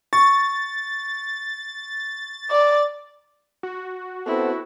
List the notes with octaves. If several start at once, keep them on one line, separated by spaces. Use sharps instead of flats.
C#6 A6
D5
F#4
B3 C4 E4 A4